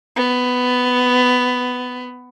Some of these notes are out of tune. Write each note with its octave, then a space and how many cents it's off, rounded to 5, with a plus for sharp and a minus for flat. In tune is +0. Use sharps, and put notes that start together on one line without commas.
B3 +15